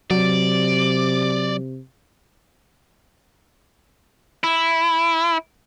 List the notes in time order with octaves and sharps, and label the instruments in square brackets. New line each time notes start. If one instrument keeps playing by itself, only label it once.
[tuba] C3 [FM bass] F#3 [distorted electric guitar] D5
[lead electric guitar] E4